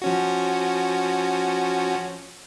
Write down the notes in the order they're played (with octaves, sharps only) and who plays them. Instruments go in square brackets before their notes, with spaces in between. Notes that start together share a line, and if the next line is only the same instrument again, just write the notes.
[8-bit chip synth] F3 C#4 F#4